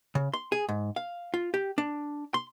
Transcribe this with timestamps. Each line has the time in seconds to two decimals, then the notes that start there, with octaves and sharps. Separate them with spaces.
0.15 C#3
0.34 C6
0.52 G#4
0.69 G#2
0.96 F5
1.34 F4
1.54 G4
1.78 D4
2.34 C6